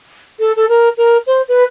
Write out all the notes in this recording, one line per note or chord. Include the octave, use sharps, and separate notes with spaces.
A4
A4
A#4
A#4
C5
B4